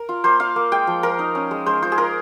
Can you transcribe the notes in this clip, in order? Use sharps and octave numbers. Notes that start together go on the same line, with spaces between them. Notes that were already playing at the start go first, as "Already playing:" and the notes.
Already playing: A#4
F4
A#3 C5
F4 F5
A#3
G#3 G5
F3
F3 A#4
D#4
C#4
G#3
G#3 C5
F4 C5
G#4
F4 A#4